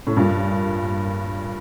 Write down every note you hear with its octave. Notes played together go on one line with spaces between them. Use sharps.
A2
G2 A#2